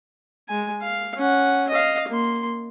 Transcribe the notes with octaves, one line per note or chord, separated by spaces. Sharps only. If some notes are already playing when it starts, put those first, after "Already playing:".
G#3 G#5
F5
C#4 F#5
D#5 F5
A#3 C6